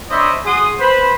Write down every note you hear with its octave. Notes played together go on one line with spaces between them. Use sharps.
D4 C5 C#5 D#5 E5 B5
F#4 G#4 C6 D#6
B4 C5 B5